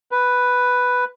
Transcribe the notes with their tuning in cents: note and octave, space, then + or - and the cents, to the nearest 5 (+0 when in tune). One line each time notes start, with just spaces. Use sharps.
B4 +0